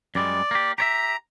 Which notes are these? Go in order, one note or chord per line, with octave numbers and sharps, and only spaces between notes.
F#2 G3 G#3 D5
A#3 G4
G4 C#5 E5 A#5